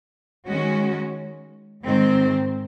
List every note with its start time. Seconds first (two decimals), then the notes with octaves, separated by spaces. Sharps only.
0.48 D#3 G#3 C#4 F#4
1.85 G#2 D#3 G#3 C4